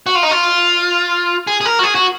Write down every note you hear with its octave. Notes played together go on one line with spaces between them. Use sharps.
F#4
F4
D#4
F4
G#4
G#4
A#4
F#4
G#4
F#4